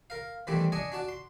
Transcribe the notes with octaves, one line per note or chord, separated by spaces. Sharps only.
A#4 F5
D#3 E3 G3 A3 C4 D4
D4 D#5 G#5 C#6
D4 F#4 A5
C6